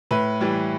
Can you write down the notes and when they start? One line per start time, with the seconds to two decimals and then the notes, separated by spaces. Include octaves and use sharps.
0.11 A2 B4
0.40 E3 G3